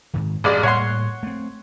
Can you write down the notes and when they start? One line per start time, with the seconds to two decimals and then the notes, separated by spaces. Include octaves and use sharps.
0.14 G#2 D#3
0.44 A1 G2 G#3 D5
0.63 A2 G3 A#3 C#5 F#5 C6
1.23 A3 C4